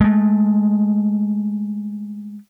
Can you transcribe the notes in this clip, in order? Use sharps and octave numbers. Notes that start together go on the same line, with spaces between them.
G#3 A3